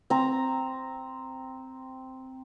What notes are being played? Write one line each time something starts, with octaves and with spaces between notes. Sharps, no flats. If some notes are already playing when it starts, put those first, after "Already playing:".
C4 A#5